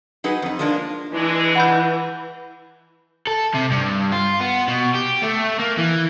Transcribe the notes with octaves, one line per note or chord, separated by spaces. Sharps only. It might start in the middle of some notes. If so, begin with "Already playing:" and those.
F#3 D#4 G#4 B4
F2 D#4
F3 G#3 A#3 D4
E3 G#3 D4
F#5 B5 G6
A4
C3
G2
F4
B3
B2
G4
A3
A#3
E3